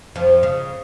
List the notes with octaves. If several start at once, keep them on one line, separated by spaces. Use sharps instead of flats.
F2 F3
C#3